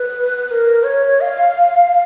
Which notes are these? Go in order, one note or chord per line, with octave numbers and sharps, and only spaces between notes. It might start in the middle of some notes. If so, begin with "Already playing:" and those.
Already playing: B4
B4
A#4
C#5
F5